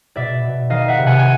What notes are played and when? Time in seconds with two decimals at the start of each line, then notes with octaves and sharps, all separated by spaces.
0.16 B2 D5 E5
0.44 B2
0.70 D#3 D#5 F5
0.88 E5 F#5
0.98 C3
1.06 F#5 G#5
1.19 G#5